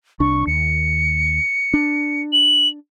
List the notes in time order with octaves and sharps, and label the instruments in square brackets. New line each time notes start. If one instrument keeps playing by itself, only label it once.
[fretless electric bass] C2 D4 [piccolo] C#6
[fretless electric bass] D#2 [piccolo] C#7
[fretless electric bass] D4
[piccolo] F#7